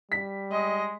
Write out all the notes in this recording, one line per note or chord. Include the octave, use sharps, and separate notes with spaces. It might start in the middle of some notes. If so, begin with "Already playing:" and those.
G3 B6
G#3 D#5